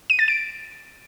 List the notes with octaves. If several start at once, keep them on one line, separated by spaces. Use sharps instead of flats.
D#7
A6
D7